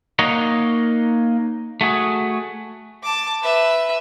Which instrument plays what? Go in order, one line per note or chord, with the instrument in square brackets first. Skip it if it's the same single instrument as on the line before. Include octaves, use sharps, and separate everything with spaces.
[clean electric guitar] A#3 D#4 C#5 D#5 F#5
A3 F#4 G#4
[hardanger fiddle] A5 D6
B4 E5